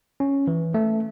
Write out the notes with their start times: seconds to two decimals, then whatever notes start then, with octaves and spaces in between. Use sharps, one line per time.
0.20 C#4
0.47 E3
0.74 A3